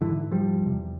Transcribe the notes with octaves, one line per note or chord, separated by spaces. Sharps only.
G#2 D3 E3
F3 G3
E2 C3